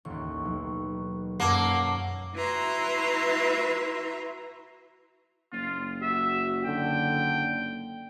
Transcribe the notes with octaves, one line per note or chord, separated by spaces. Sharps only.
A1 D#2 C#6
B1
F#2 A#3 F#5 A5 D6 E6
E4 F#4 B4 E5 A#5 C6
F#1 F4
F#4 E5
D3 G5